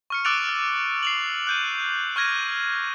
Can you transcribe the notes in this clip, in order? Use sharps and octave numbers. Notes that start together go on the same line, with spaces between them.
C#6 F6 C#7
D6 E6 F#6 A6 D7 F7
F6
C7 F7 F#7
F#6 G6 D#7
C#6 F6 F#6 G#6 A#6 D#7